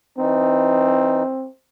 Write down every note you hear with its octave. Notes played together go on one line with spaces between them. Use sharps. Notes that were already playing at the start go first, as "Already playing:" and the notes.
E3 C4 D#4